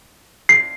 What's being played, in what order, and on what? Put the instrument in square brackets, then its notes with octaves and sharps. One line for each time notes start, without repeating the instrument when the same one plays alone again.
[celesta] C7